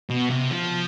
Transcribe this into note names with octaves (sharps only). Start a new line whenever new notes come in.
B2
C3
F3